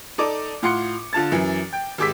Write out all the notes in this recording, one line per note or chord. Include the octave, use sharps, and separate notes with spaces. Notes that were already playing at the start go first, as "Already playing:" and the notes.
D#4 A4 D5 D6
A2 F4 F#5 C6 C#7
D3 F4 A5 A6
F#2 E3
G5
G#1 G#3 G4 D6 E6 B6